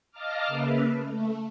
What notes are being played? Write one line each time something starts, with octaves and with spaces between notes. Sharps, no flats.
D#5 F5 A5 A#5 D6 F6
C#3 A#3 B4 E5
A3